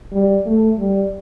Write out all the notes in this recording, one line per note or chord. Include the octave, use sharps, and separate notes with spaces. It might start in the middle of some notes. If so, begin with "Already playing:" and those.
G3
A3
G3